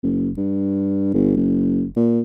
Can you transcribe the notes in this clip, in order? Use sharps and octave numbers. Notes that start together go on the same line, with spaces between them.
F#1
G2
G1
F#1
A#2